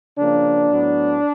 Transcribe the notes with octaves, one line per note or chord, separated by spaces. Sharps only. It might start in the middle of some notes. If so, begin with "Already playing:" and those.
C#3 F3 A#3 D4
A2 F#3 B3